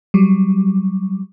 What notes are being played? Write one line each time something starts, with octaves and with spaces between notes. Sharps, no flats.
F#3 G3